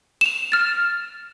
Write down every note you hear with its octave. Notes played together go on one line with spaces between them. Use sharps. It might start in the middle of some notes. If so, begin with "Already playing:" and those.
E7 F7
F6 A6